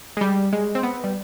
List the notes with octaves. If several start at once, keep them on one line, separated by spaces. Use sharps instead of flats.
G#3
G3
G#3
C4
B3
G3